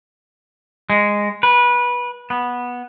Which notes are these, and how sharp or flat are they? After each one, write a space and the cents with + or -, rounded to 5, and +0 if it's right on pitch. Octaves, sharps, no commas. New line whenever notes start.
G#3 -10
B4 -20
B3 -10